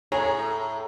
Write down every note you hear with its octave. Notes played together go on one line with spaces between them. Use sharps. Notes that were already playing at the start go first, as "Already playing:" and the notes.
A2 G#4 C#5 A#5